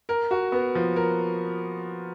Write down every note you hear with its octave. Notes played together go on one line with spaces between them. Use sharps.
A#4
F#4
B3
F3
A#4